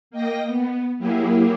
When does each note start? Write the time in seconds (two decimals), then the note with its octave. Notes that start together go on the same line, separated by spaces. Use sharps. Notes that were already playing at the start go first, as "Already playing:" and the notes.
0.11 A#3 D#5 G5 A#6
0.46 B3
0.98 F#3 A#3 E4 G4 G#4